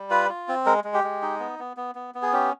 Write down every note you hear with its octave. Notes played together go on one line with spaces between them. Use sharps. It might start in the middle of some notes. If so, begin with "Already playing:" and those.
Already playing: G3
F4 B4
F4
C4
G#3 A#4
G#3
G4
G#3
D#4
B3
B3
B3
B3
B3
G#4
C#4 G4